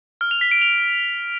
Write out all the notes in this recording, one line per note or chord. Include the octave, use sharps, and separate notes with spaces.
F6
F7
B6
D7
F7